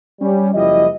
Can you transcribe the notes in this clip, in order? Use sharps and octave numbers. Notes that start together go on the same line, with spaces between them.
G3 C#4
F#1 F3 G3 E4 D#5